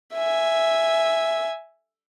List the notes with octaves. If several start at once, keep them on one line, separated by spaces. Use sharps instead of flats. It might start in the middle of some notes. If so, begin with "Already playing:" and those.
E5 G#5